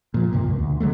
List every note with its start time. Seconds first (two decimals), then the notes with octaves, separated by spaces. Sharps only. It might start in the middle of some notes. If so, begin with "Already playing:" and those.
0.14 A#2 F3
0.33 C#2 G2 C3 A#3
0.44 E1 C#2
0.59 D2
0.80 D3 F#3 G#3 A3